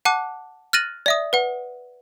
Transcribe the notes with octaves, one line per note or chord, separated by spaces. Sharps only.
F#5 A5 D6 F#6
F6 F#6 A6 A#6 D#7 F#7
D5 E5 D#6
B4 F#5